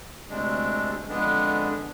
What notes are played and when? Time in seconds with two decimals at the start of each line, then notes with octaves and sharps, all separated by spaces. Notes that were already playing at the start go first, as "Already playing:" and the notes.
0.29 D2 C3 G#3 D4
1.06 F2 D3 G#3 B3 D4